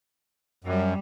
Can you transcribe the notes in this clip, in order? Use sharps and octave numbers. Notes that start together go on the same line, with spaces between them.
F#2 G3